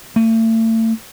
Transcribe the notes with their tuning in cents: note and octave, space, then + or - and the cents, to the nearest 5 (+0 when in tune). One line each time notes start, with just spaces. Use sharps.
A3 +40